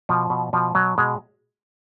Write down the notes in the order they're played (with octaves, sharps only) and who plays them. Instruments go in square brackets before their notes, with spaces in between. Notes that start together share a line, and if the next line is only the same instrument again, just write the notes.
[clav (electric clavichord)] B2 F3
B2
B2 F3
B2 F#3
B2 G#3